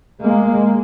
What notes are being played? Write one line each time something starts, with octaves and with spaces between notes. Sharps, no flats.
G#3 A#3